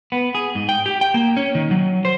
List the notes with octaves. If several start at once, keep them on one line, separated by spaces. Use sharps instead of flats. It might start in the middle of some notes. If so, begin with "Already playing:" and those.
B3
G#4
G#2
G5
G4
G5
A#3
C#4
D#3
F#3
C5